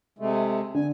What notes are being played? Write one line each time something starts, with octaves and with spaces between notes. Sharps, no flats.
C3 G#3 A3
D3 G#5